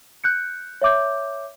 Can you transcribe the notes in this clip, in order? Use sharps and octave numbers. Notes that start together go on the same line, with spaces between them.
F#6 G6 C#7
C#5 E5 D6 G6